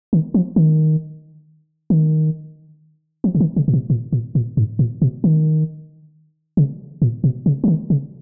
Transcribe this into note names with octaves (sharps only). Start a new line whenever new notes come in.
D#3
F3
D#3
D#3
F3
C#3
D#3
C#3
A#2
B2
A#2
A#2
A#2
G#2
A#2
B2
D#3
C#3
A#2
B2
C#3
F3
D#3
C#3